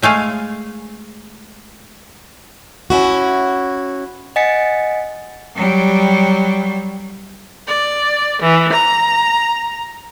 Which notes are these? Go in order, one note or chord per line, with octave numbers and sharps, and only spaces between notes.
G#3 A3 G#4 F5
C#4 E4 F#4
D#5 F#5 G#5 A6 B6 C#7
F#3 G3
D5
E3
A#5